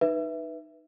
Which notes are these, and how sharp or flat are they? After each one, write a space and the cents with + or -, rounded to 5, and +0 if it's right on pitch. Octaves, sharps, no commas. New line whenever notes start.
D#4 -10 B4 -5 E5 +0